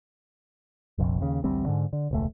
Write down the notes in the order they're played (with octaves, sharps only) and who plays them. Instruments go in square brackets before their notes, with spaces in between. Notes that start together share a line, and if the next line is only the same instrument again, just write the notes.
[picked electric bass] F1 A#1 F2
D#2 C#3
A1 D2 G3 C4
G#2 D3
D3
E1 C#2 A3